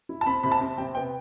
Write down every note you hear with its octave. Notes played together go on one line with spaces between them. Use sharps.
E4
A5
C4 B5
C3 B5
A5
C4
C3 G5
B3 G5